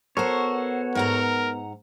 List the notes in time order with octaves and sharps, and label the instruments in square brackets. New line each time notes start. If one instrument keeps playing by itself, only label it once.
[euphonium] B3 [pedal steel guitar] F#4 A4 C#5 [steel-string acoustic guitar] A#4 C5
[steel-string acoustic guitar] G#2 F#5 A#5 [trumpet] A#4